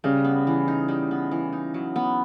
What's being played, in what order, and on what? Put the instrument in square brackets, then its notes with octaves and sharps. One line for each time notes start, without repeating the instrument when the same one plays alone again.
[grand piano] C#3 [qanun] G3
[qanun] B3
E3
D#4
G3
B3
E3
D#4
F#3
B3